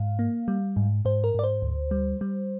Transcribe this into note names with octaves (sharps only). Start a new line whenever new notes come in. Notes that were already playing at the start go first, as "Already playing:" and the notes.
Already playing: G#2 F5
A#3
G3
G#2
G#2 C5
A#4
G#2 D5
C5
D2
G3
G3